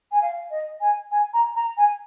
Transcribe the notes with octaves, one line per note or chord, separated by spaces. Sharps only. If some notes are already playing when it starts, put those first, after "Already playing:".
G#5
F5
D#5
G#5
G#5
A#5
A#5
G#5